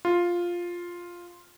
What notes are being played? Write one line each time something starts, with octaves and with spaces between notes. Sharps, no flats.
F4